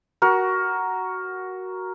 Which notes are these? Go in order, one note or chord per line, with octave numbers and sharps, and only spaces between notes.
F#4 A#4